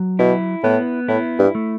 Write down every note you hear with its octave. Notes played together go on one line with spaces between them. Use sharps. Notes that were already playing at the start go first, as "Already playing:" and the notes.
Already playing: F#3
B2 E4
A2 B3
A2 E4
G2
A3